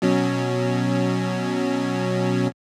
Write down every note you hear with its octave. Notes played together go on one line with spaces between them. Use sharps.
B2 F#3 C#4